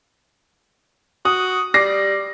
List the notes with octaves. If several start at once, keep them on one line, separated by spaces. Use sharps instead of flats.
F#4 D#6
G3 D6 A#6 C7